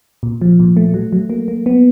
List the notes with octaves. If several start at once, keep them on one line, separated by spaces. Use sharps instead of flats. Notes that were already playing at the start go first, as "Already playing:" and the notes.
A#2
F3
A#2
A3
F#3
F#3
A#3
A#3
B3